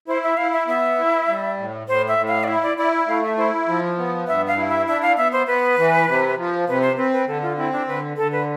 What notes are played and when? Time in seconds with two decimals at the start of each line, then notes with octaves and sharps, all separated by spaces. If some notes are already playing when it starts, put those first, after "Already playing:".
0.08 E4 C5
0.24 E5
0.37 E4 F5
0.53 E5
0.67 B3 E5
0.98 E4
1.28 G3
1.57 A2
1.87 A2 C5
2.08 E5
2.18 A2
2.28 F5
2.44 D5
2.47 E4 E5
2.63 D5
2.77 E4 D5
2.93 E5
3.08 A3 F5
3.23 E5
3.37 E4 C5
3.68 F3
3.98 B3
4.28 G2 E5
4.48 F5
4.57 E4
4.68 E5
4.88 D4 E5
5.02 F5
5.18 B3 E5
5.32 C5
5.47 B3 B4
5.78 E3
6.08 C3
6.37 F3
6.68 C3 B4
6.82 C5
6.97 C4 B4
7.13 B4
7.27 D3 A4
7.42 F4
7.58 C4 E4
7.72 D4
7.88 D3 B4
8.17 D3 A4
8.32 B4